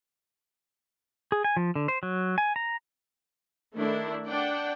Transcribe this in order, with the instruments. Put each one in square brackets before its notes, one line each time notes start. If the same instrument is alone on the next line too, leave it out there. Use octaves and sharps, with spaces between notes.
[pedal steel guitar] G#4
G#5
F3
D3
C5
F#3
G#5
A#5
[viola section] D#3 A3 D4 E4
D4 D5 F#5 G5